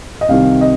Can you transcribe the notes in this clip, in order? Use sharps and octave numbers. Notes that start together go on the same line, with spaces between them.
D#5
C2 C3 D#3 F5
D#5